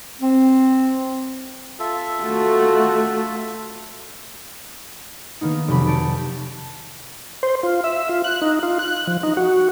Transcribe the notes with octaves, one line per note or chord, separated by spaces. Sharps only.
C4
F4 A4 E5
A3 F#4
D#3 A#3 B3 D#4
F1 C3 F#3 B5
D5 A5 G6 C#7 D7
C5
F4
E5
F4
F#6
D#4
F4
F#6
F3
D#4
F#4